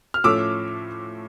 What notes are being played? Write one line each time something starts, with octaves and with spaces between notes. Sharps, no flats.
F6
A2 F3 A3 C#4 D6 E6